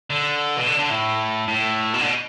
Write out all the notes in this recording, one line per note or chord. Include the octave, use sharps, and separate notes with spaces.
D3
B2
D3
D3
A2
A2
B2
D3
B2